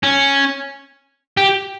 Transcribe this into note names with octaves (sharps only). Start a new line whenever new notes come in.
C#4
G4